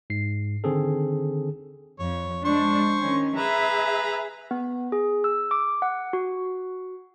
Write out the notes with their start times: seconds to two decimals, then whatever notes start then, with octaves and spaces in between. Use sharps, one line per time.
0.10 G#2 C7
0.64 D3 D#3 C4 G#4 A4
1.99 F2 C#5
2.45 G#3 D4 C5 C#6
3.01 D#3 C#4
3.35 G#4 B4 E5 A#5 B5
4.51 B3
4.92 G#4
5.24 E6
5.51 D6
5.82 F#5
6.13 F#4